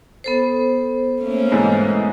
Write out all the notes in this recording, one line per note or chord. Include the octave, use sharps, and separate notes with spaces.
B3 A4 C5
A3 A#3 C#4
G#2 B2 E3